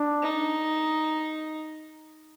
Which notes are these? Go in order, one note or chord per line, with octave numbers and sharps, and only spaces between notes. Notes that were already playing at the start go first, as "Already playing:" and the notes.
Already playing: D4
D#4